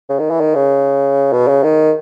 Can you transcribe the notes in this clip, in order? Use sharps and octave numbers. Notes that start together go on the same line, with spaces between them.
C#3
D#3
E3
D#3
C#3
B2
C#3
D#3